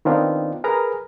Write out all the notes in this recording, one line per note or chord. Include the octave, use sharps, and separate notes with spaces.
D#3 B3 C4 D4 D#4 F4
G#4 A#4 B4 A#5